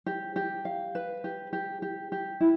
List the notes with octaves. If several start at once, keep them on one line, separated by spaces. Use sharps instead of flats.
G4
G4
F5
B4
G4
G4
G4
G4
E4